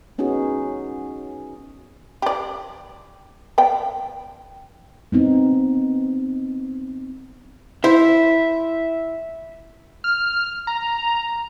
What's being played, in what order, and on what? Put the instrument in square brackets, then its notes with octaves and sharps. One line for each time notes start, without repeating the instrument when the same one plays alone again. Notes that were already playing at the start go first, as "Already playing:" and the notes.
[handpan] B3 C#4 D#4 F#4 G#4
[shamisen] G4 D5
B3 D5 G5
[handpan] B3 C4 D#4
[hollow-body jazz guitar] E4 C5 [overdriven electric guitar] E5
[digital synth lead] F6
A#5